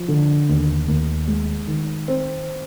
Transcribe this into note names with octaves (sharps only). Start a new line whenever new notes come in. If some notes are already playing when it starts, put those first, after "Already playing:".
Already playing: F3
D3
D#2
D#2
G#3
D#3
C4